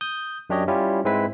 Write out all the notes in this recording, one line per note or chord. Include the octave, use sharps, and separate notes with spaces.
D#6 G6
F#2 D4 G4 C#5 D#5
G3 C#4 E4 F4 G4
G#2 G#3 C4 E4 B4 B6